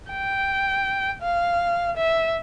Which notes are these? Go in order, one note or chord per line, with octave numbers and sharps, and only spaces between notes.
G5
F5
E5